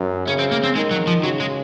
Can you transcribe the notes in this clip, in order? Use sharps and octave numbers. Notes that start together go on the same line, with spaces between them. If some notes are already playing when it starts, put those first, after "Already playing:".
Already playing: F#2
C#3 C#4
C4
A#3
C4
D#3 G#3
F#3
F3
C#3 F#3
G#3